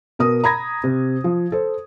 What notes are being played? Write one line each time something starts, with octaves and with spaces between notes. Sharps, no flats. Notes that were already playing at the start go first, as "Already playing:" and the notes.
B2 A#4 D#6
A#5 B5 G#6 A#6
C3
F3
A4 C5